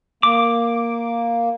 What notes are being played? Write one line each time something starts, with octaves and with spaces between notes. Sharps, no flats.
A#3 D6